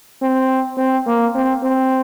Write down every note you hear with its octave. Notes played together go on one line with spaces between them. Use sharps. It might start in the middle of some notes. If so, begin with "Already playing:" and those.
C4
C4
A#3
C4
C4